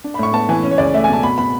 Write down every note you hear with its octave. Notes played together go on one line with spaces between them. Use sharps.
D4
B5
A2 C#6
B3 A5
E3 G#5
C#4
C#5
C#2 D5
A3 E5
G#5
B2 A5
B2 B5
B2 B5